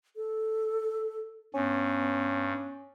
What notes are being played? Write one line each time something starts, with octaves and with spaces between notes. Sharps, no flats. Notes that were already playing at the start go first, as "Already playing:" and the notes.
A4
G2 B3 C#4